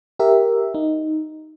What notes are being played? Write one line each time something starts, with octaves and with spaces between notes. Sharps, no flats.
G4 A#4 E5
D#4